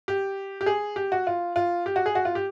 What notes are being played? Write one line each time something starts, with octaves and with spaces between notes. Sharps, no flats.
G4
G4
G#4
G4
F#4
F4
F4
G4
F#4
G#4
F#4
F4
G4